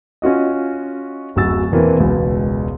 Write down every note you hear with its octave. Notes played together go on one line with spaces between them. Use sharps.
C#4 F4 F#4 D#5
D1 F#2 F#4 E6 A6
E2 B2 E3 A#3 C4
E1 C#2 B2 B3